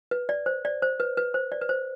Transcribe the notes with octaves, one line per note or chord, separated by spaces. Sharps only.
B4
D5
C5
D5
C5
B4
B4
C5
D5
B4
C5